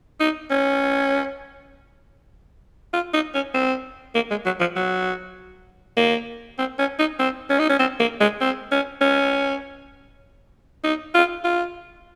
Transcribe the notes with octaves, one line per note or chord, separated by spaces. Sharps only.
D#4
C#4
F4
D#4
C#4
C4
A#3
G#3
F#3
F3
F#3
A#3
C4
C#4
D#4
C4
C#4
D#4
C#4
C4
A#3
G#3
C4
C#4
C#4
D#4
F4
F4